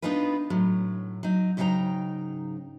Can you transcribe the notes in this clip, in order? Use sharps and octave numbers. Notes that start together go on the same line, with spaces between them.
B3 D4 D#4 F4 A#4 B4
A2 F#3
F#3 D#4
G#2 C#3 F#3 D#4 G5 A#5